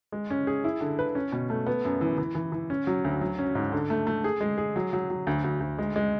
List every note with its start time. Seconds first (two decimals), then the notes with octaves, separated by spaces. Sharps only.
0.12 G#3
0.31 C#4
0.47 G#4
0.64 E4
0.81 D3
0.99 B4
1.15 C#4
1.32 B2
1.50 A3
1.67 B3
1.85 F#2
2.01 E3
2.18 E3
2.35 E3
2.52 E3
2.70 C#4
2.87 F#3
3.04 D2
3.21 F#3
3.39 C#4
3.55 G#2
3.72 D3
3.90 A3
4.07 A3
4.24 G#4
4.41 G#3
4.58 G#4
4.76 F#3
4.93 F#3
5.10 F#3
5.27 D2
5.44 D2
5.60 D2
5.78 G#3
5.96 G#3